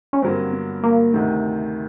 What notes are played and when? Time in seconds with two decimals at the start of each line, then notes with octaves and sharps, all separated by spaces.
0.13 C#4
0.22 G2 D3 F#3 A#3 C4
0.52 B3
0.84 A#3
1.13 D2 C3 D#3 A3